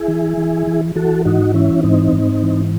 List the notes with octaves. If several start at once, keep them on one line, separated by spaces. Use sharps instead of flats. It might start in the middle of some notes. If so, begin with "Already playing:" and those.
Already playing: E4 G#4
E3
E3
E3
E3 F#4 A4
G#2 D#4 F#4
E3 C#4 E4
G#2 C4 D#4
G#2
E3